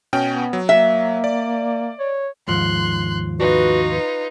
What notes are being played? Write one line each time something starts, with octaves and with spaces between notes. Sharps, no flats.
B2 C#4 G5
B3
F#3
A#3 E5
D5
C#5
D#2 G#2 F3 C6 F#6
D#4 F4 F#4 B4
B4